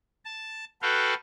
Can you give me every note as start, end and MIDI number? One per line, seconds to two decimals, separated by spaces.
0.25 0.64 81
0.82 1.14 66
0.82 1.14 69
0.82 1.14 71
0.82 1.14 77
0.82 1.14 79